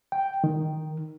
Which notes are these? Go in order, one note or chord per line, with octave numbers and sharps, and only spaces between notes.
G5
D#3